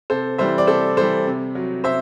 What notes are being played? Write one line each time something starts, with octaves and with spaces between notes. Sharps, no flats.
C3 A4 C5
E3 G3 C5 E5
D5
C3 A4 C5
E3 G3 A4 C5
C3
F#3
C3 C5 E5